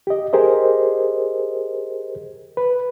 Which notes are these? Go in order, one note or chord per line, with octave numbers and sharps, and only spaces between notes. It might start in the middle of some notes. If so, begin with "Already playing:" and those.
G4 D#5
G4 G#4 A#4 C5 D#5
B4